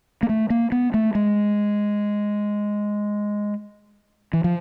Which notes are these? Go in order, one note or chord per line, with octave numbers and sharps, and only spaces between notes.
A#3
A3
A#3
B3
A3
G#3
E3
F3